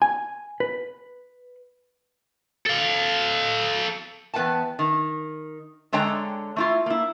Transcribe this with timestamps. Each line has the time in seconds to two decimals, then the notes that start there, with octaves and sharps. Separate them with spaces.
0.02 G#5
0.60 B4
2.67 A4 F5
4.34 E2 B3 B4 F#5 G5 A5
4.79 D#3
5.93 D3 G#3 D4 C#5 G5 A#5
6.56 A3 E4 F4
6.86 A#3 E4